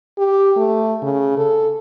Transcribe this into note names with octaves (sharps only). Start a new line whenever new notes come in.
G4
A3
C#3
A4